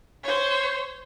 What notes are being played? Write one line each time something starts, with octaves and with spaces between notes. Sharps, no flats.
C5 C#5